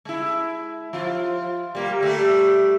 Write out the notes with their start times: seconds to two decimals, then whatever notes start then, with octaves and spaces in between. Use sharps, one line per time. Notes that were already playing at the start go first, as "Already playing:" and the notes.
0.05 G#3 E4
0.93 F3 F4
1.75 G3 A#3
2.00 G3 A3 G4